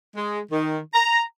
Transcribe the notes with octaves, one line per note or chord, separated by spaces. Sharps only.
G#3
D#3
A#5